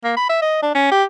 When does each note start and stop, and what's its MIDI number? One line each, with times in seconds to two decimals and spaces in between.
0.04 0.14 58
0.17 0.28 83
0.30 0.38 76
0.42 0.60 75
0.63 0.74 62
0.75 0.89 61
0.92 1.04 67